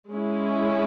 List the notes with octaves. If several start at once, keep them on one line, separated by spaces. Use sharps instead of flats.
G#3 C#4 E4